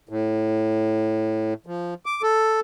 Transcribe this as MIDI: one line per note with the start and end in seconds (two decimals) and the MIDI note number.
0.09 1.54 45
1.66 1.94 53
2.06 2.22 86
2.22 2.60 69